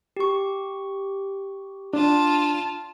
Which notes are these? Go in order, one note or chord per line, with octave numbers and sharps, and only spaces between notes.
G4 C#6
D4 F4 A5